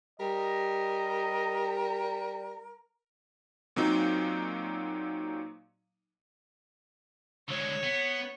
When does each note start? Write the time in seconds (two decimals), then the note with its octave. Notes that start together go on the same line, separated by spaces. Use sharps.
0.20 G3 A#4 D#5
3.76 A#2 F#3 C4 D#4
7.48 D3 G#3 C#5
7.83 B3